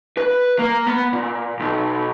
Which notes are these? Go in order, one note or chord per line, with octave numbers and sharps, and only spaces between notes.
B4
A#3
B3
A#2
B1